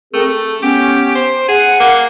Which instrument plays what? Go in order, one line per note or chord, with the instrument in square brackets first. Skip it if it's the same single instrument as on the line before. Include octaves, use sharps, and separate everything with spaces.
[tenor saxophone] A3 [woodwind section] C4 G#4 A#4
[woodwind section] A4
[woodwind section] B3 C#4 [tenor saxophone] G4
[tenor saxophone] C5
[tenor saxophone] G#4 [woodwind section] F#5
[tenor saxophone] A#3